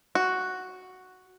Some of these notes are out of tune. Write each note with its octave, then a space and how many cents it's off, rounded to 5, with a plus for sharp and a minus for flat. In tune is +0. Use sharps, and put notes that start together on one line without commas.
F#4 +0